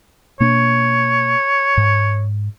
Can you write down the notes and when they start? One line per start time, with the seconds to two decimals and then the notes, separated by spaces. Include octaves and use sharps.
0.40 B2 A#3 D4 C#5
1.77 G#2